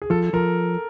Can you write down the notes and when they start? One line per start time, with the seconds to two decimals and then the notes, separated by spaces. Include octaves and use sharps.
0.02 G#4
0.10 F3 A4
0.33 F3 A#4